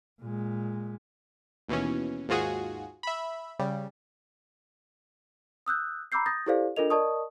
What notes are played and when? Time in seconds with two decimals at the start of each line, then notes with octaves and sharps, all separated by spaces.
0.21 A#2 G#3
1.69 D#2 B2 E3 C#4
2.29 D#2 G#2 F4 F#4 G#4
3.03 E5 B5
3.59 C#3 G3
5.66 D#6 E6 F#6 G6
6.12 A#5 B5 D6 E6 G6 C7
6.26 D#6 G6 A6 A#6
6.46 E4 G4 A4 C5 D5 F5
6.76 D4 F4 A4 A#4 D#5 F7
6.90 A#4 D5 D#5 A5 C#6 D#6